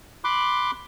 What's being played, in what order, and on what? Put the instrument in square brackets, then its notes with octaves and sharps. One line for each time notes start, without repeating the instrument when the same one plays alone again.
[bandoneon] B5 C6 D6 F#6